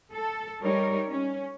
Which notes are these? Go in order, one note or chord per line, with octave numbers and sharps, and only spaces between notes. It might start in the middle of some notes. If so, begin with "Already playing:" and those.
A4
G3 D#4 A#4 C#5
C#4